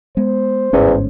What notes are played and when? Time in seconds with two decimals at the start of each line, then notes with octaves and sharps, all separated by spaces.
0.17 G#3 B3 C5
0.73 G1 E2 G#2 C#4